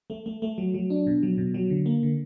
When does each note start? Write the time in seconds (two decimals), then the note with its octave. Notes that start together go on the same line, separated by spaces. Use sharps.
0.10 A3
0.26 A3
0.42 A3
0.58 F#3
0.74 F#3
0.90 D4
1.07 B2
1.23 F#3
1.38 B2
1.54 F#3
1.70 D3
1.86 A#3
2.03 D3